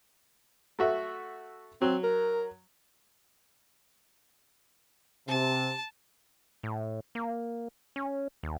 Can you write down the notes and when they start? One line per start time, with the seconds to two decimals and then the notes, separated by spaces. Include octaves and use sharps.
0.79 A3 F#4 E5
1.82 F#3 C4
2.04 A#4
5.28 C3 A5
6.63 A2
7.15 A#3
7.96 C#4
8.43 D#2